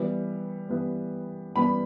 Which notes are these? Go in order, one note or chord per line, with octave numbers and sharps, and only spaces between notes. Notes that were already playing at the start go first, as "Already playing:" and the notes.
Already playing: E3 G3 B3
E3 G3 B3
E3 G3 B3 B5